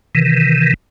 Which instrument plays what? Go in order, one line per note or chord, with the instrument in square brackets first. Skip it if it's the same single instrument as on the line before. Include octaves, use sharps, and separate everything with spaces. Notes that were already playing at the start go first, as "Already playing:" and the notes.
[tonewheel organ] C3 D#3 E3